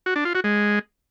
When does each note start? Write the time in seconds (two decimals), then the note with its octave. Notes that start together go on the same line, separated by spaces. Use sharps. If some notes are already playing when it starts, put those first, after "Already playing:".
0.06 F#4
0.16 D4
0.25 F4
0.35 F#4
0.44 G#3